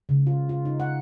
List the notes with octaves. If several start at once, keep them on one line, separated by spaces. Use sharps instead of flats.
C#3
F4
F4
D#4
F#5